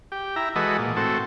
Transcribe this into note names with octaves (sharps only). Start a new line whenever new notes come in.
G4
E4 A#5
E3 G#3 F#4 A4 B4 D#5
A#2
A2 C4 F#4 A4